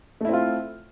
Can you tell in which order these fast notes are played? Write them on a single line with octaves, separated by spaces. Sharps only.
A3 E4 C4 F4